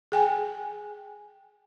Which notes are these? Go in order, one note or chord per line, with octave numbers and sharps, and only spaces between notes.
G#4 G5 G#5